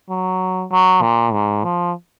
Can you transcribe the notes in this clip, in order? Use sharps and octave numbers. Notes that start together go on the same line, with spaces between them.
F#3
F#3
A#2
G#2
F3